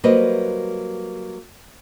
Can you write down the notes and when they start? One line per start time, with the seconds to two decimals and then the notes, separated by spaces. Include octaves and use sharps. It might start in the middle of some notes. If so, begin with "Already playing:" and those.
0.04 F#3 G3 A#3 B4 C5 D#5